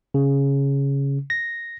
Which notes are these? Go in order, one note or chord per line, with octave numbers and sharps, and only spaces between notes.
C#3
A#6